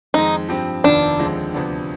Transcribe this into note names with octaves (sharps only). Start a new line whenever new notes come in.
F2 D#3 G#3 D#4
G2 F3 C4 G4
F1 D#2 D#3 B3 D4 F4
D#2 D3 F3 G#3 C4
D2 C3 F3 B3 D4